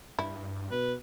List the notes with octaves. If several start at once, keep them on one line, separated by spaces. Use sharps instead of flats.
G2 E4
B2 B4